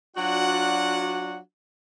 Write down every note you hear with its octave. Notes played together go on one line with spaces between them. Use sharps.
F#3 D4 F4 F#4 D5 F#5